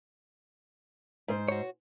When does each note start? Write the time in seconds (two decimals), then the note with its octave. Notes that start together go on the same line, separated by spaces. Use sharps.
1.28 G#2 C5
1.49 F#4 C#5